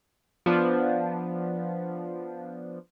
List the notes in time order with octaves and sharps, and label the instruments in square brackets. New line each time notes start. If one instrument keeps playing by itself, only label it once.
[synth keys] F3 B3 D4